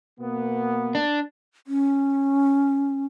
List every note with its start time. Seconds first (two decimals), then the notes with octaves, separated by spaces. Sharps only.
0.20 B2 A#3 B3
0.95 D4
1.67 C#4